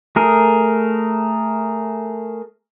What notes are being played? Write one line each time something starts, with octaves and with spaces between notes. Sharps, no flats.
A3 G#4 A#4